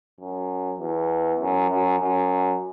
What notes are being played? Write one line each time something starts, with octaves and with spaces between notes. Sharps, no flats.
F#2
E2
F#2
F#2
F#2